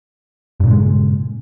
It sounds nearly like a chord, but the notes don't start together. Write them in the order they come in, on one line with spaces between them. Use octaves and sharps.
G2 A#2 C#3 G#3